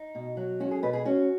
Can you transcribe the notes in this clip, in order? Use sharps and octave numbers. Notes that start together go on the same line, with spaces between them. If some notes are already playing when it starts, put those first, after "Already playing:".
Already playing: D#4
B2
F#3
C#4 F#4
G#4
B2 B4
G#4
C#4 F#4